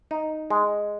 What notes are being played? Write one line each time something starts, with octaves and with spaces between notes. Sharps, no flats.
D#4
G#3